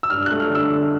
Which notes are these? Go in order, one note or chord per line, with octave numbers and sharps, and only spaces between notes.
E6
G2 F6
A3 F#6
F6
D3 E6
D3